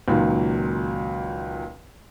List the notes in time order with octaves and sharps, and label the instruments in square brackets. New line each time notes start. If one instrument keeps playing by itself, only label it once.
[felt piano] C#2 A#2 D#3 F#3